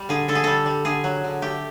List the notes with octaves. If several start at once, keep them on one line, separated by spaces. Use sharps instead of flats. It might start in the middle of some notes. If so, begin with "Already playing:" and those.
Already playing: G3
D3 G#4
D3 A4
G#4
G3 A4
G3
D3 G#4
F#3
D3
A3 G4